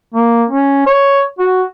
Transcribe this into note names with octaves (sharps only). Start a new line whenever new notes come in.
A#3
C#4
C#5
F#4